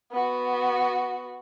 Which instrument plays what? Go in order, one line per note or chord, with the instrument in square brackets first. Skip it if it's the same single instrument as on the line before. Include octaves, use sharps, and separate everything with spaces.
[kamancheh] B3 F#4